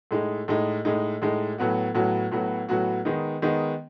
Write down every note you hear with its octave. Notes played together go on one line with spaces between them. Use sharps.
A2 G#3 D#4
A2 G#3 D#4
A2 G#3 D#4
A2 G#3 D#4
A2 F#3 B3 F#4
A2 F#3 B3 F#4
A2 F#3 B3 F#4
A2 F#3 B3 F#4
D#3 G#3 B3 D#4
D#3 G#3 B3 D#4